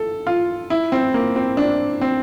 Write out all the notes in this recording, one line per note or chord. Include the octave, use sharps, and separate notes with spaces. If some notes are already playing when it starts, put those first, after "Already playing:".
Already playing: A4
F4
E4
C4
A#3
C4
D4
C4